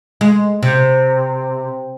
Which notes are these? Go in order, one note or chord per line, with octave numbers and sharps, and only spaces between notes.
G#3
C3